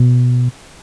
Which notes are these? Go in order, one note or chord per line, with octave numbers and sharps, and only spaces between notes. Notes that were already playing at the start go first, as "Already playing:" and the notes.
Already playing: B2